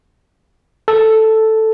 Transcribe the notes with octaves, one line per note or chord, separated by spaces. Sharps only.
A4